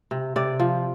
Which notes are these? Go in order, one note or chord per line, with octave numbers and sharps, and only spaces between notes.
C3
C3 D5
F3